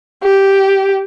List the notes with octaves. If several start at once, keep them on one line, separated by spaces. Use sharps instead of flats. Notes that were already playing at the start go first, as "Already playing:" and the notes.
G4